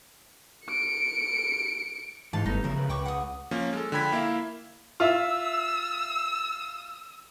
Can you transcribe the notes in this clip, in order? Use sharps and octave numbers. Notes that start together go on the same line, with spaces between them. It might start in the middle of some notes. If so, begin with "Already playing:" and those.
C#7 D7
G#2 E3 G#3 D#4 F5 A5
G1 G3 A3 B3 D#4
C#3 F3 A#4 E5
B4
C#2 G5 C#6 D6
F#5 D#6
F3 A#3 C#4
G#3 A4
D3 F3 G5 B5 G#6 B6
A#3 E4 E5 F5
F4 E5 E6